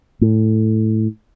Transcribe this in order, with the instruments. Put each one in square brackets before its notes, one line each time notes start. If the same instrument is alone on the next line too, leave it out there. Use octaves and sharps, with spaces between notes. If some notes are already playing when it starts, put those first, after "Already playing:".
[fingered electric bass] A2